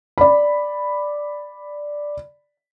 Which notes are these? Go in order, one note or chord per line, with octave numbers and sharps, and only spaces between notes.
D5 B5